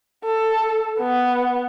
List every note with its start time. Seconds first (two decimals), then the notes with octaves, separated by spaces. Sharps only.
0.25 A4
1.00 B3